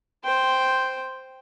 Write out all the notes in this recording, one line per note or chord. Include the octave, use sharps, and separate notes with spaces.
C5 G5